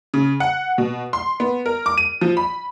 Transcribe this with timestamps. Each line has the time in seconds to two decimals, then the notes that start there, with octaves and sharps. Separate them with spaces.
0.14 C#3
0.40 F#5
0.78 B2
1.13 C6
1.40 B3
1.66 A#4
1.86 D6
1.98 D#7
2.21 F3
2.37 B5